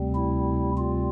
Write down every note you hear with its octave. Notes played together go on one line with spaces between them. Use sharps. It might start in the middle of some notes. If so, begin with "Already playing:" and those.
Already playing: D2 C3 G3 C4
E4
F4